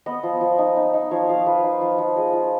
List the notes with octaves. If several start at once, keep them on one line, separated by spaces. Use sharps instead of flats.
B3 D#5
F3
F3
D#4
D#4
D#4
F3 C#5
F3 F5
F3 B4
D#4
F3
F3
G#3 D#5
F4